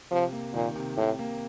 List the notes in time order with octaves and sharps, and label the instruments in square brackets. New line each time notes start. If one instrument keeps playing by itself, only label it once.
[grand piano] C3 [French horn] F3
[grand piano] A#3
[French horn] A#2 [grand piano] D#3
[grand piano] C3
[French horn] A2 [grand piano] C3
[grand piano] A#3